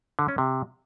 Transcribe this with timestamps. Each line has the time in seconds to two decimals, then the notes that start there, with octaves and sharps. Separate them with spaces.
0.19 D3
0.28 C#4
0.38 C3